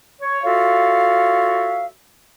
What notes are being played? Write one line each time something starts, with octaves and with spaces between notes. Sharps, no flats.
C#5
F4 F#4 A4 C#5 E5 F5